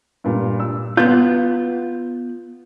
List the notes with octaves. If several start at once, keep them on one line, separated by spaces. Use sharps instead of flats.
G2 A#2
E6
B3 F4 G6